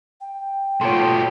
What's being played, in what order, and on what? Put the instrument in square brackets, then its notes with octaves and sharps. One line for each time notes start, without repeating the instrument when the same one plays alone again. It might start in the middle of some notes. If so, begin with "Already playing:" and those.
[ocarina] G5
[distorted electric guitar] B2 G4 [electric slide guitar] A3 F4 A4 [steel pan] C#5 C6